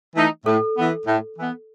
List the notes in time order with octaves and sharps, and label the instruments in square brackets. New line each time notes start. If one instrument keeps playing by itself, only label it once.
[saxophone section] E3 A3 D#4
[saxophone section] A2 [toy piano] A4
[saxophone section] E3 B3
A2
E3 B3